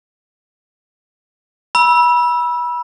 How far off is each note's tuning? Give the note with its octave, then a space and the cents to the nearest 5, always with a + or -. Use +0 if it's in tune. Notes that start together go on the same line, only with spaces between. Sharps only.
B5 -25 E6 +0